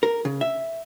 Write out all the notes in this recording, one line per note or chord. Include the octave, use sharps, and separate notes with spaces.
A#4
C#3
E5